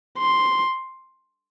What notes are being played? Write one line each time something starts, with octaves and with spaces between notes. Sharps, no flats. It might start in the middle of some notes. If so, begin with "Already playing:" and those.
C6